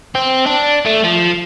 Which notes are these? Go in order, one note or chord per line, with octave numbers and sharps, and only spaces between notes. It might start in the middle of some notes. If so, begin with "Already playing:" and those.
C4
D4
A3
F3